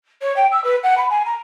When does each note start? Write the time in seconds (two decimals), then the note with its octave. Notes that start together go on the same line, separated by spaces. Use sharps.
0.22 C#5
0.36 G5
0.52 E6
0.64 B4
0.83 F#5
0.97 B5
1.10 G#5
1.26 A#5